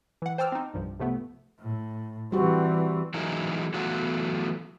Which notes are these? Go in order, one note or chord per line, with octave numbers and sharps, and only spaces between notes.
E3 F#5
C5 G5 A5 D6 E6 F6
C4 D#4
C2 G2 F3
C3 F3 A3 B3
A2
E3 G3 C4 F#4
E3 F#3 G#3 A#3 D#4 E4
E3 F#3 A3 B3 F4 F#4